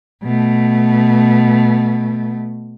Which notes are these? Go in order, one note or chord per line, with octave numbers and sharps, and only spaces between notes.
B2 A3